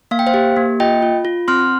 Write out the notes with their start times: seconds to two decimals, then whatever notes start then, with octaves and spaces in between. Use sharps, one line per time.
0.11 A#3 F5
0.19 G5
0.27 C5 F5
0.34 G4
0.56 A#3
0.80 F4 D#5 G5
1.02 F4
1.25 F4
1.48 C4 C6 F6